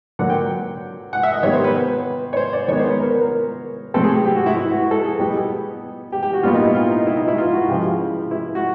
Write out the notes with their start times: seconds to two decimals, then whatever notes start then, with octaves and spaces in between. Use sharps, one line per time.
0.19 D3 F#3 A#3 F#5
0.30 G5
1.13 F#5
1.23 E5
1.33 D#5
1.43 D#3 G3 B3 C#5
1.53 C5
1.64 B4
1.75 B4
2.33 C#5
2.37 C5
2.53 D5
2.68 D#3 G#3 B3 C#5
2.79 C5
2.89 B4
3.00 A#4
3.10 A#4
3.21 A#4
3.94 A2 F#3 A3 C4 A4
4.03 G#4
4.14 G4
4.25 G4
4.35 F#4
4.46 E4
4.57 E4
4.71 F#4
4.91 A4
5.05 G#4
5.19 B2 G3 B3 G4
5.34 G#4
6.12 G4
6.23 G4
6.33 F#4
6.43 A#2 G3 B3 F4
6.54 D#4
6.65 E4
6.74 F4
6.90 D#4
7.07 E4
7.16 D#4
7.28 E4
7.38 F4
7.53 F#4
7.68 C#3 F3 G#3 G4
7.84 E4
8.31 E4
8.55 F#4